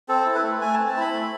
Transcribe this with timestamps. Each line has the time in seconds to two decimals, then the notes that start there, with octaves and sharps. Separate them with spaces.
0.08 C4 A4
0.26 E4
0.35 B4
0.44 A3
0.61 A3 G#5
0.74 A5
0.78 C4
0.87 A5
0.97 E4 B5
1.13 A3